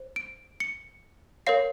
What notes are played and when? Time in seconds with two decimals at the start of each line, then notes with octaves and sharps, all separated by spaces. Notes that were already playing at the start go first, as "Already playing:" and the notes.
Already playing: C5
0.16 D7
0.60 C#7
1.47 A#4 C#5 F5 C7